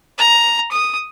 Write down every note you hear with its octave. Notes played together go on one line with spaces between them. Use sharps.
A#5
D#6